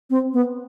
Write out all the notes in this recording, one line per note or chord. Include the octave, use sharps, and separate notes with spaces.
C4
B3